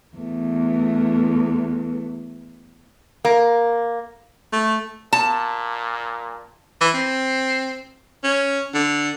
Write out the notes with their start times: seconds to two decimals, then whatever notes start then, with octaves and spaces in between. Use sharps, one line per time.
0.17 E2 A3
3.25 A#3
4.53 A3
5.13 A#2 A5
6.81 E3
6.94 C4
8.24 C#4
8.74 D3